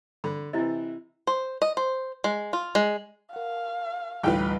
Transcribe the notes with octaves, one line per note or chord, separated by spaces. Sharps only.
D3 B5
C3 E3 E4 D#5
C5
D#5
C5
G#3
F4
G#3
A#4 F5 F#5
A1 D2 G3 D#4 F4 B4 G5 A#5